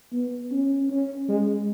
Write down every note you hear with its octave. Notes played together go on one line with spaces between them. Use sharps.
B3
C#4
C#4
G#3